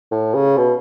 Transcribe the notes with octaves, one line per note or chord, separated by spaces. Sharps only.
A2
C#3
B2